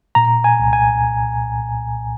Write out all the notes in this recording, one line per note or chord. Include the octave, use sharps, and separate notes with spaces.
A#2 A#5
G#5
C2
G#5